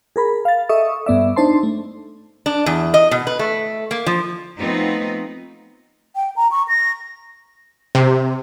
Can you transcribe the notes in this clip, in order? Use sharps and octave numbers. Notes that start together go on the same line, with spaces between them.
G#4 A#4 B5
F5 A6
A4 D#5 E5 C#6 D#6
G2 B3 D5 E5
D4 D#4 C5 A5 C6
A3
D4
E2
D#5
B2
B4
A3
A#3
F3
F3 A3 B3 C4 D#4 F4
G5
A#5
C#6
A#6
C3